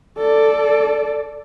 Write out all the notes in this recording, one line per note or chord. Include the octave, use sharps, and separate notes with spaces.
A4 D5